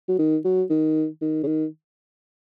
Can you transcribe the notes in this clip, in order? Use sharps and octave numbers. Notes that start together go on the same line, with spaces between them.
F#3
D#3
F#3
D#3
D#3
C#3
D#3